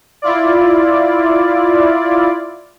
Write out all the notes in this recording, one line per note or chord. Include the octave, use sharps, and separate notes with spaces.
E4 F4 D5